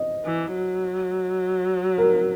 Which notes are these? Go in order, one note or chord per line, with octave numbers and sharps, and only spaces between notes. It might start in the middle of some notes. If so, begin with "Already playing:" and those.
Already playing: D#5
E3
F#3
A#4